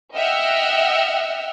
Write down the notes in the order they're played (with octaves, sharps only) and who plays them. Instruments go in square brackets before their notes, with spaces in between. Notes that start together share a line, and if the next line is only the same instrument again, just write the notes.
[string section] D#5 E5 F#5 G5 E6 F6